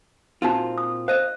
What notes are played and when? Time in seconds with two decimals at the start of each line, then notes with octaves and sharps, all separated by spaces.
0.42 A#2 C4 D#4 F4 F#4
0.78 D#6
1.08 C5 D#5 F5